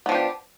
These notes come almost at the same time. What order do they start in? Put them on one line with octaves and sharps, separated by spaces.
B3 F3 D4 G4